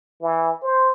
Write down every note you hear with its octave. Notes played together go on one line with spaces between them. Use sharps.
E3
C5